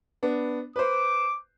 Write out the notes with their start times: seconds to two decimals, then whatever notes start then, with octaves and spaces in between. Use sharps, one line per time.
0.23 B3 D4
0.76 B4 C5 D6